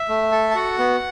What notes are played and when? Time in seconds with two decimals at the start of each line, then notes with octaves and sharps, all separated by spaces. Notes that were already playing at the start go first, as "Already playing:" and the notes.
Already playing: E5
0.09 A3
0.31 A4
0.51 A5
0.55 F#4 F#5
0.78 B3